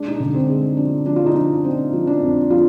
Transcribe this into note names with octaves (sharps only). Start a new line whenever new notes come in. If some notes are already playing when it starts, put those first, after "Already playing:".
Already playing: G#3 D4
D#4
D3 D4
C4
G#3
F3 D4
F3 D4
F4
D#4
F3 D4
F3 C4
F3
D4
F2
F3 F4